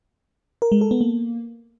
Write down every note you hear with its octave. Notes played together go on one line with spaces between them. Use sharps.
A#4
G#3
A4
B3
A#3